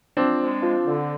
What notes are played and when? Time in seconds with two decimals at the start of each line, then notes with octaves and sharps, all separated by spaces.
0.16 F3 C4 D4
0.40 G#3
0.62 F3
0.84 D3